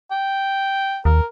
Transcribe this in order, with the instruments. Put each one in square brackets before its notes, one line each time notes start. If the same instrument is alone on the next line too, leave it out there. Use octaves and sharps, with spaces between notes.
[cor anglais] G5
[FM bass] D#2 [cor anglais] A#4